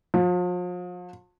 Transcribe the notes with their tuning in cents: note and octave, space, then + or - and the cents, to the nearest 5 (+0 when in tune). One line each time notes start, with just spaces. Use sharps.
F3 +40